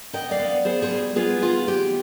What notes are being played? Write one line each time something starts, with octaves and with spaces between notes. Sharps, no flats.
B3 D#5 G5
D5 F5
B3
B3 G#4 C5
G#4 C5
G3
B3 F4 G#4
D#3 F4 G#4
B3 G4